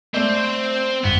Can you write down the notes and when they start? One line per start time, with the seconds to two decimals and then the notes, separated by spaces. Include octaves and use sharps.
0.14 A3 C4 C5 D5
1.04 G1 B3